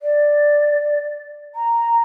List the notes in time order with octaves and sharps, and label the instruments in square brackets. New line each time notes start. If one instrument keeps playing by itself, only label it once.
[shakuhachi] D5
A#5